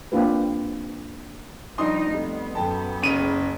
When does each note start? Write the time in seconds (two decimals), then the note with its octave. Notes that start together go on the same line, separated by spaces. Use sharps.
0.12 A#3 C4 D4 F4 G4 B4
1.78 F3 G3 D4 D#4 D#5 C6 D#6
2.12 F2 G3 A3 B3
2.55 F#2 A4 G5 A5
3.02 F#1 C#3 D#7